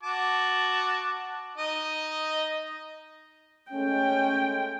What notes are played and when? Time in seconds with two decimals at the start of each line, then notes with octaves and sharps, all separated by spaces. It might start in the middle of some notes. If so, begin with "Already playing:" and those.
0.03 F#4 A5 D6
1.58 D#4 D#5
3.72 G#3 A3 C#4 G5